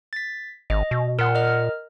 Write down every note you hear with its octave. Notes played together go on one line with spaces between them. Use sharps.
A6 B6
G#1 D#5
B2
A#2 A#4 F#5
A#4 D#5 F6